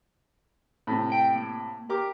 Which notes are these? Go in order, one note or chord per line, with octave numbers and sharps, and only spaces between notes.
A2 C3
G5
A#3
G4 A#4 D6